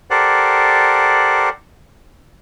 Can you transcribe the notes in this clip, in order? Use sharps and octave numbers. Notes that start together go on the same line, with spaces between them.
G4 A4 A#4 C5 D5 F#5